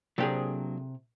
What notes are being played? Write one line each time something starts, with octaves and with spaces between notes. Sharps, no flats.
C3 F#3 A#3 D4 G4 G#4